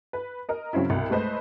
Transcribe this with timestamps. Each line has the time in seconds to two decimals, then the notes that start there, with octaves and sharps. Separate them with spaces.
0.13 B4
0.49 A#4 D#5
0.73 C#3 F#3 C4 C#4 E4
0.90 C2 B2
1.10 G#3 A3 B4 C5 D#5